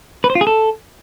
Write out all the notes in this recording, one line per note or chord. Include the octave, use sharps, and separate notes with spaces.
B4
C5
F4
G#4
A4